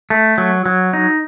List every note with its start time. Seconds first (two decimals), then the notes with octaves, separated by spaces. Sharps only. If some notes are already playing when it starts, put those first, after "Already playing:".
0.10 A3
0.38 F#3
0.66 F#3
0.93 D#4